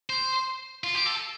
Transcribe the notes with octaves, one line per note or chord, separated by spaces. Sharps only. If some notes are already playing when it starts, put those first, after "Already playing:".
C5
F4
G4
A4